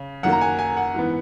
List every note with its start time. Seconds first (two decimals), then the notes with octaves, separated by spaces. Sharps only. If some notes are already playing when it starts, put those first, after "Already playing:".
Already playing: C#3
0.23 F#2 D#3 A#3 F#5
0.32 A#5
0.41 G#5
0.59 G#5
0.77 F#5
0.94 G#2 E3 B3